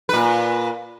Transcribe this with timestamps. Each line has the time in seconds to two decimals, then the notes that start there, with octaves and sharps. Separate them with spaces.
0.09 A#2 B4